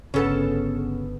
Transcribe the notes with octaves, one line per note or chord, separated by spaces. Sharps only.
G1 C#3 B3 C#4 A4 A5